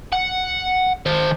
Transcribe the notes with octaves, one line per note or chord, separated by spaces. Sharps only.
F#5
D#3 C5